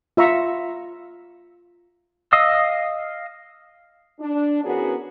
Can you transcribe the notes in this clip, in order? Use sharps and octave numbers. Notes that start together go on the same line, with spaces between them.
F4 E5 A#5 C#6
D#5 F5 D#6 E6
D4
E3 B3 C#4 F#4 G#4 A#4